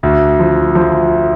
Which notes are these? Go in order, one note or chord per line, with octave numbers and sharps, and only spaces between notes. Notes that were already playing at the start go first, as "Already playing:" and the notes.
D2
F3
F3